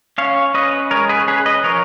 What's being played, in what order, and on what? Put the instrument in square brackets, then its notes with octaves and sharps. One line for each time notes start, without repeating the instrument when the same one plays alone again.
[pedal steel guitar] C#4 C#5 F5
C#4 B4 D#5
G#3 A#4 C#5
G#4 B4
C#4 G#4 B4
B4 D#5
F3 A#4 C#5